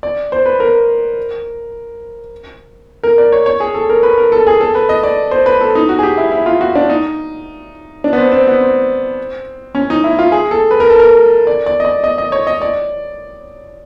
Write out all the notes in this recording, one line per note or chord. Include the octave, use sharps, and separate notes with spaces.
D5
C5
B4
A#4
A#4
D5
C#5
C#5
G#4
A4
A#4
B4
A#4
A4
G#4
A4
B4
D#5
D5
C5
B4
A4
D#4
F#4
G#4
G4
E4
E4
F4
F#4
D4
D#4
D4
B3
C4
C4
B3
C4
C#4
D#4
E4
F4
G#4
A4
B4
A#4
A4
A#4
D5
D5
D#5
D5
D#5
D#5
C#5
D#5
D5